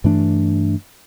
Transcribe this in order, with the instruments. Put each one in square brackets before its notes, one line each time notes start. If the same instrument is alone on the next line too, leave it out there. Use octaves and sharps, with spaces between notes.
[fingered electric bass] G2 E3 A3 D4